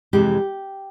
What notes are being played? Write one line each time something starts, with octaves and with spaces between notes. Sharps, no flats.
F2 C3 E3 G#3 G4